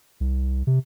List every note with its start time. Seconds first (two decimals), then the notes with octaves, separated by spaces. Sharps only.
0.20 C2
0.67 C3